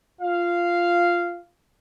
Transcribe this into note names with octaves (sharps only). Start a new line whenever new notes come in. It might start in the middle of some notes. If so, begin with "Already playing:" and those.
F4 F5